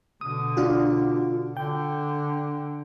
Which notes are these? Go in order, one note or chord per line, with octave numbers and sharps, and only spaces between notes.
B2 D3 D#6
D4 F4 F#4
D3 G5